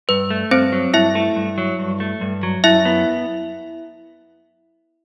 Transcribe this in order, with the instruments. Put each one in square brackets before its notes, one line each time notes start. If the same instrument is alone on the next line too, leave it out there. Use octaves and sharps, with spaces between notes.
[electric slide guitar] G2 [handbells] B4
[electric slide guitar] A3
[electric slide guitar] G2 [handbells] C4 C5
[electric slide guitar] F#3
[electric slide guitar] G2 [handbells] E4 E5
[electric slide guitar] A3
G2
F#3
G2
A3
G2
F#3
[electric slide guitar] F#2 [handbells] E4 E5
[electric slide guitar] B3